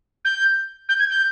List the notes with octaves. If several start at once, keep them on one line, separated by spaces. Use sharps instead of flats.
G6
G6
G#6
G6